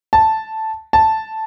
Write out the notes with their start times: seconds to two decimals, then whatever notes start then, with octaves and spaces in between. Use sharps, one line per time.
0.13 A5
0.93 A5